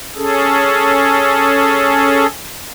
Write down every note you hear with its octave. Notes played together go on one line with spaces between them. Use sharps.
C#4 G#4 A4